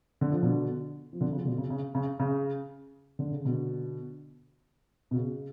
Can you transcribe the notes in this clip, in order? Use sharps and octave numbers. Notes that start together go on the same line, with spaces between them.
D3
F3
B2 D3
F3
B2 D3
C#3 F3
B2 D3
C#3
C#3
C#3
C#3
D3
C#3
B2 D3
B2
C#3